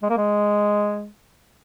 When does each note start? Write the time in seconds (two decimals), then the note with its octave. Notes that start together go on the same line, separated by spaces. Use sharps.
0.03 G#3
0.10 A#3
0.17 G#3